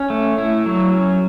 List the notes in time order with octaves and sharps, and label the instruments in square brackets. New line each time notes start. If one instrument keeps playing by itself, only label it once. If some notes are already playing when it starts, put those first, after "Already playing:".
Already playing: [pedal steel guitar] C#4
A3
E4
F#3
C#4